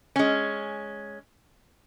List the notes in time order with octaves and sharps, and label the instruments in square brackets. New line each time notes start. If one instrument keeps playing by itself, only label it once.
[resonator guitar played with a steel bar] G#3 C#4